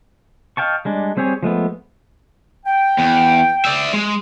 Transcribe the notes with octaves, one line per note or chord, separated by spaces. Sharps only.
D#5 F5 G5 A5 C#6
G3 G#3 D4
G3 C4 G4 G#4 C#5
F3 G#3 A3 B3
G5
E2
D5 E5
G#3